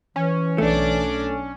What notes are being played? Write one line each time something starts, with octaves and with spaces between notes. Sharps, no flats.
E3 C#4
B1 A3 D4 D5